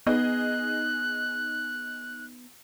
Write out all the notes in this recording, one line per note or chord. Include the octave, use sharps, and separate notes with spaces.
B3 D#4 G#4 D#5 F#6